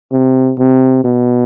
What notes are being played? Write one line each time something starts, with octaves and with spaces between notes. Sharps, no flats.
C3
C3
B2